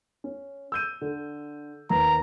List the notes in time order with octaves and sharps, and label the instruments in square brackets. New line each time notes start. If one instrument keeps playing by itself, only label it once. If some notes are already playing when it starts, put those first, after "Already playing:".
[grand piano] C#4
E6 G6 D#7
D3
[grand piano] D#2 B4 [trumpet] A#5